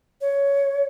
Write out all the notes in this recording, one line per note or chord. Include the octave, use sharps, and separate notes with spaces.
C#5